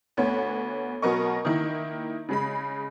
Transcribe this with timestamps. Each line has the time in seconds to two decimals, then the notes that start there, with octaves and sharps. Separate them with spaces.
0.17 D2 B3 C#5
1.02 B2 F#3 B3 A#4 D#5 C#6
1.45 D#3 A#3 E4
2.29 C#3 G#3 B5